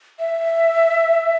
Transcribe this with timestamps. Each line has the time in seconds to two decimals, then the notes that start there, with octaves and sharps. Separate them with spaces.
0.19 E5